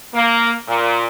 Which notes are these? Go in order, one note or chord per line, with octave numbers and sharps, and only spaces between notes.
A#3
A#2